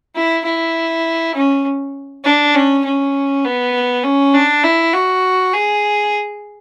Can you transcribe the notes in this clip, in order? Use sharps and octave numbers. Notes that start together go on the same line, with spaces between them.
E4
E4
C#4
D4
C#4
C#4
B3
C#4
D4
E4
F#4
G#4